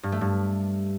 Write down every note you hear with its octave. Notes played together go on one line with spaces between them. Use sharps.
G2
A3
G2